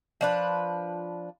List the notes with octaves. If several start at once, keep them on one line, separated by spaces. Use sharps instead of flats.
F3 D4 B4